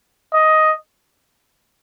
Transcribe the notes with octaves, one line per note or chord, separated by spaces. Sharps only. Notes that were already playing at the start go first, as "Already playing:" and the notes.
D#5